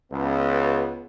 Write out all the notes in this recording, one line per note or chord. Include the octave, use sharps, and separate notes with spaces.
C#2 B3